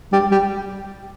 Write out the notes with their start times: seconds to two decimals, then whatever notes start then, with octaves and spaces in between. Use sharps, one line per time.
0.12 G3
0.31 G3